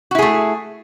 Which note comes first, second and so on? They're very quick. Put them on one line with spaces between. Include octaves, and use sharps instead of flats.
F#4 E4 G#4 A3